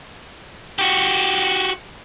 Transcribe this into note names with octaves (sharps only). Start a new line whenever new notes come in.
F#4 G4